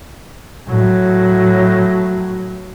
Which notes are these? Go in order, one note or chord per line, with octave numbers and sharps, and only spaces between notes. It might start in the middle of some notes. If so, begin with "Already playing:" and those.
A2 F#3